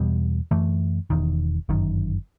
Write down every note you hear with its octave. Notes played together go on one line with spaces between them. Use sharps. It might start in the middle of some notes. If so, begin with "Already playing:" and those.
Already playing: E2 B2 G3
F#2 E3 A3
E1 E2 D#3
G1 F#2 D#3